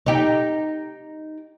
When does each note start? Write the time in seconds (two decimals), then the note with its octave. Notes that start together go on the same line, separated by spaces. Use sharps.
0.06 D#4 G4